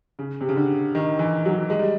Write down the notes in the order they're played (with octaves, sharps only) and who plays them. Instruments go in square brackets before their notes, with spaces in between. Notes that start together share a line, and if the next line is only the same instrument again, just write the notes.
[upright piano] C#3
C3
C#3
D3
D#3
E3
F#3
G#3
G3